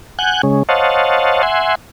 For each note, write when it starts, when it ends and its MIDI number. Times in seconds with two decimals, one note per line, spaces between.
0.19 0.41 78
0.19 0.41 80
0.19 0.41 90
0.19 0.41 91
0.43 0.63 49
0.43 0.63 56
0.43 0.63 61
0.69 1.42 72
0.69 1.42 73
0.69 1.42 75
0.69 1.42 77
0.69 1.42 78
0.69 1.42 81
1.43 1.75 76
1.43 1.75 78
1.43 1.75 80
1.43 1.75 84